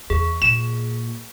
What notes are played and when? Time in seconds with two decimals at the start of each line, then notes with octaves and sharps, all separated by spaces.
0.10 E2 G#4
0.42 A#2 E7